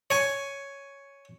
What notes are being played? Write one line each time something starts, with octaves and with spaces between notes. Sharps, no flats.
C#5 G#5